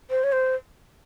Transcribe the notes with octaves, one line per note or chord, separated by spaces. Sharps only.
C5
C#5
C5